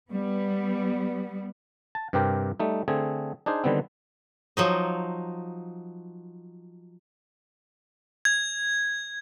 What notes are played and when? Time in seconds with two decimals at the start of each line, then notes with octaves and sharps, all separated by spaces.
0.11 G3 B3
1.95 A5
2.13 G2 C3 C4 G4 A#4 G5
2.60 G3 A3 D#4
2.88 D3 A3 C4 G#4
3.46 D4 D#4 G#4 C5
3.64 D3 D#3 G3 B3 C4
4.57 F3 F#3 D#4
8.25 G#6